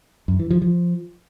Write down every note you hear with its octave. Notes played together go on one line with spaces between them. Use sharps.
F#2
E3
F3
F3